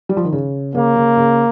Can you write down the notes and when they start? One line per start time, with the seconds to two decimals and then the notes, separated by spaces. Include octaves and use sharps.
0.09 G3
0.17 F3
0.25 D#3
0.32 C#3
0.75 C#3 A#3
0.96 C#3
1.17 C#3